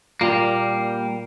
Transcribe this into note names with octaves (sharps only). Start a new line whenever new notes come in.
A#2 G3 A#3